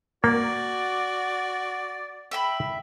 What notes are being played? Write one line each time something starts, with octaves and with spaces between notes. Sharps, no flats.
A#3 F#4 D5
E5 G5 B5